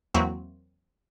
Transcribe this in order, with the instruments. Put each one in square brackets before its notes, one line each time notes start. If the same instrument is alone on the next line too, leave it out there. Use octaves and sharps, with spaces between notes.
[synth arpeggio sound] E2 F#3 A#3 C4 E4 F#4